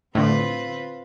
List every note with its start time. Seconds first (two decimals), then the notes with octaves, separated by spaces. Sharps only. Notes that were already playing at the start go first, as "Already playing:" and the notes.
0.15 A2 D3 C4 F4 B4